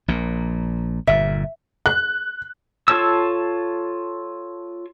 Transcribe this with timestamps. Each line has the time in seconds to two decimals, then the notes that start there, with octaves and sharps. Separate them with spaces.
0.08 A#1 A#2
1.07 G1 A#2 E5
1.86 F#6
2.88 F4 A4 C#5 A5 E6